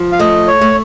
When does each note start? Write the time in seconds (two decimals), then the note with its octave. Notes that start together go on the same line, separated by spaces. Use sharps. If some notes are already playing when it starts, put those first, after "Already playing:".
Already playing: F3
0.12 F5
0.19 A3 D#5
0.47 C#5
0.61 A3